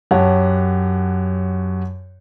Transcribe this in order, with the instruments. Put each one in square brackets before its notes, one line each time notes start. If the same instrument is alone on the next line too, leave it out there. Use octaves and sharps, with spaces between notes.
[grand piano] F#2 G4 C#5 F#5 A5